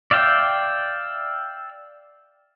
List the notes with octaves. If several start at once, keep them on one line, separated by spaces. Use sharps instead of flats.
D5 E5 F5 G5